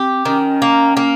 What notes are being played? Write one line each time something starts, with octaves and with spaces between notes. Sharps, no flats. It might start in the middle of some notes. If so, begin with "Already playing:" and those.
Already playing: C4 G4
D#3 C#4
A#3
A#3